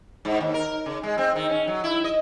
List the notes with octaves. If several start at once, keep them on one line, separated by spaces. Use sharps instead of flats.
G#2
D#2
A#4
C#3
G#3
C4
D#3
C#4
F#3
E4
D#5